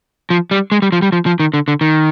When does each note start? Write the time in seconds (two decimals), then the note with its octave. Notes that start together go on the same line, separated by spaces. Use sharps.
0.30 F3
0.51 G3
0.72 G#3
0.82 G3
0.92 F3
1.02 G3
1.12 F3
1.26 F3
1.40 D#3
1.54 D3
1.68 D3
1.81 D#3